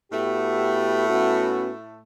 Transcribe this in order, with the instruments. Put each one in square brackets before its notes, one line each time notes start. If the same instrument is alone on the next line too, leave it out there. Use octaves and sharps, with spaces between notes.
[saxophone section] A2 A3 [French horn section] B3 F#4 G4
[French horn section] B3 C#4 F#4